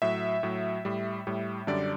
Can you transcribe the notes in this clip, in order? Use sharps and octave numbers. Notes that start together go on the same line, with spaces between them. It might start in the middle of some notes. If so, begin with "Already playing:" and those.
A2 F#3 E5
A2 F#3
A2 G3
A2 G3
F#2 D3 G3 D5